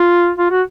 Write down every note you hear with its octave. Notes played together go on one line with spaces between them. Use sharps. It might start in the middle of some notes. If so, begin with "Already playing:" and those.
Already playing: F4
F4
F#4